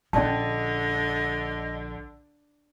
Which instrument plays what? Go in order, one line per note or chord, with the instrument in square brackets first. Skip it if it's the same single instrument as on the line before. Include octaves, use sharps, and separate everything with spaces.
[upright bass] A#1 [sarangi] D3 [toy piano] C#4 D5 A5 [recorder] D#5